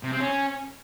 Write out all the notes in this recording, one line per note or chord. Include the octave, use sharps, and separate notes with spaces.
C3
C4
C#4